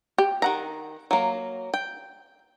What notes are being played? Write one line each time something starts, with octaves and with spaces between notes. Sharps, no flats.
G4
D#3 F#5 A#5
F#3 A#3
G5